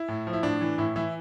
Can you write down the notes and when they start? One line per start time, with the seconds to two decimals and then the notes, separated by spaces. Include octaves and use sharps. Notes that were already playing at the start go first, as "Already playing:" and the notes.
Already playing: E4
0.08 A2
0.27 F3
0.33 E4
0.43 A2 D4
0.61 E3
0.78 A2 E4
0.96 E3 E4